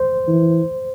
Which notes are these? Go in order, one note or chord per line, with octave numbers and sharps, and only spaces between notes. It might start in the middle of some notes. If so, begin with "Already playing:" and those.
Already playing: C5
E3